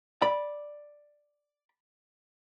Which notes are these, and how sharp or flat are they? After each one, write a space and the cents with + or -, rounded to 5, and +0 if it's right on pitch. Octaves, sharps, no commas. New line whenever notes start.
D5 +5 B5 -15